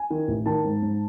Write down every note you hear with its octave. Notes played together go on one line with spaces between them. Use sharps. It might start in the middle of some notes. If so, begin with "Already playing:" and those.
Already playing: G#5
D#3
A1
D#3 A5
G#2
G#2